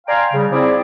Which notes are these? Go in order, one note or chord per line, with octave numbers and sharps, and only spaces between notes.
D5 F5 G5 G#5 A#5 C6
C#3 G3
F3 C4 E4 G#4 D5